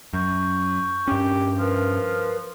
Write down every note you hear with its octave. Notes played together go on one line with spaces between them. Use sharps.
F#2 C#6 G6
G2 C#4 G4
F3 A#4 B4